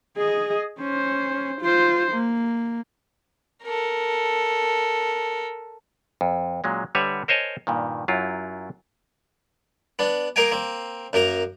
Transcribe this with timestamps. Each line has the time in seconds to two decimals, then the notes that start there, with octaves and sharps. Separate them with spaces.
0.17 G#4 D#5
0.79 C#4 C5
1.61 F4 C5
2.12 A#3
3.64 A4 A#4
6.21 F2
6.64 A#2 F#3 G#3 C#4
6.95 D3 G3 B4 C#5 E5 F#5
7.28 A#4 C5 C#5 D#5 G#5 A5
7.67 G2 A#2 D#3
8.08 F#2 F#3 E4 F4
9.99 B3 D4
10.36 A#3 A#4 D#5 F5 G5 G#5
10.52 A#3 C4
11.13 F#2 A#3 A#4 A#5